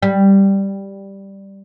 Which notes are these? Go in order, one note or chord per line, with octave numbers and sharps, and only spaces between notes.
G3